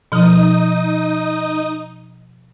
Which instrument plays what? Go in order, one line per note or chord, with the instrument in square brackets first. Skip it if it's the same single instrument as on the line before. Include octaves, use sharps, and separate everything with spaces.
[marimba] B2 F3 [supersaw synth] D#4 D#6